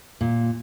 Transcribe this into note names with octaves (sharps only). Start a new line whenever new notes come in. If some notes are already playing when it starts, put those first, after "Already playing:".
A#2